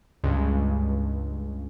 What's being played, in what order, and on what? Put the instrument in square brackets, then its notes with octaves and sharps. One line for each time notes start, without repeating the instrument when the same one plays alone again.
[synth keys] C#2 G2